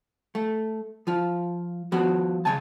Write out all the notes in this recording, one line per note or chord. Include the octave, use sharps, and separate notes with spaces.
A3
F3 F4
F3 B3 F#4
C#2 C#3 G#5 A5